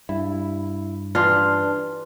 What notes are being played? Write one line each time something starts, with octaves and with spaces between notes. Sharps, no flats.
G2 E4
E3 D4 F4 G4